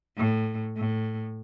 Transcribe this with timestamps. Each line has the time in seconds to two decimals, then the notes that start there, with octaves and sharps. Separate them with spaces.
0.17 A2
0.77 A2